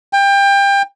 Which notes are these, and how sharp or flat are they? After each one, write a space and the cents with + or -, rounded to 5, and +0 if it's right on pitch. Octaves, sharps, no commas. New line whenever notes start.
G5 +25